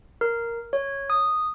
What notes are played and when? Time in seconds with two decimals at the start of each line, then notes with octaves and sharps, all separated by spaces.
0.21 A#4
0.73 C#5
1.10 D#6